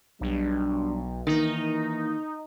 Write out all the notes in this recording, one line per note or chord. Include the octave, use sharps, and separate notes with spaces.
B1 G3 D4
D#3 E3 A#3 D#4